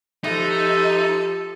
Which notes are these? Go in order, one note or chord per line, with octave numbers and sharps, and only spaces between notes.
F3 D#4 G4 A4 B4 E5